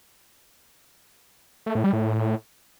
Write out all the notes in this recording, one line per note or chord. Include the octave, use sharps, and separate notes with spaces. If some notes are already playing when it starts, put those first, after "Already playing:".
A3
A2
G3
A2